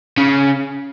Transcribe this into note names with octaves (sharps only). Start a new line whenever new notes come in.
C#3